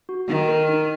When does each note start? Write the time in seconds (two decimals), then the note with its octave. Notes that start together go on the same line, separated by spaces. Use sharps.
0.09 F#4
0.29 D#3 D#4
0.49 A#4
0.69 D#4